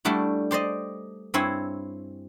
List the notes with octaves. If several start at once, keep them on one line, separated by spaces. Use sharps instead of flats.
G3 A3 D4 E4 F#4
G4 C5 D5 D#5
G2 C4 E4 C#5 G#5